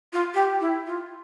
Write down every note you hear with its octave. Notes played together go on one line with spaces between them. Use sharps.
F4
G4
E4
F4